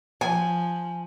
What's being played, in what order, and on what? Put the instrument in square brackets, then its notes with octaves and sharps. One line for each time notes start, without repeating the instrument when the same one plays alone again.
[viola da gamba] F3 [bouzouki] G#5